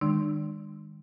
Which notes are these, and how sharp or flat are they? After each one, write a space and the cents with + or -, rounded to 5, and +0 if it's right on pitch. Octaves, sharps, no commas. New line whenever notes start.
D#3 +0 G#3 -25 D4 +45